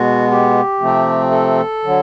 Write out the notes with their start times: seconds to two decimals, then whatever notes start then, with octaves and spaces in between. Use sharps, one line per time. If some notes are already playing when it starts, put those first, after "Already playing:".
Already playing: B2 G#3 B3 F#4
0.31 G4
0.80 C3 F3 A3 C4
1.31 A4
1.83 D3 F#3